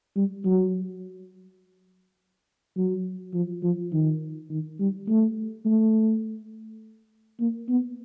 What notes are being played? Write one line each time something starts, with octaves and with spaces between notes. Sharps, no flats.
G3
F#3
F#3
F3
F3
D#3
D#3
G3
A3
A3
A#3
B3